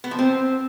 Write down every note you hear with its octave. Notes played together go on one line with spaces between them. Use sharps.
B3
F3
C4